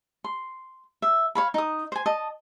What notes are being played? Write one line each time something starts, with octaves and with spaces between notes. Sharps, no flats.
C6
E5
C#5 F5 B5
D#4 D#6
C5 G#5
D#5 A5